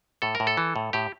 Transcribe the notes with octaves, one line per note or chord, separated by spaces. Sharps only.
A2 A4
A#4
A2
A4
E3
A2
A2 G4